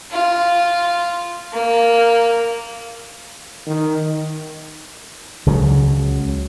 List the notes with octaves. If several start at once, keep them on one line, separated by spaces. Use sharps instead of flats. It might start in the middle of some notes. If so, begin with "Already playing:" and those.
F4
A#3
D#3
C#2 C#3 F#3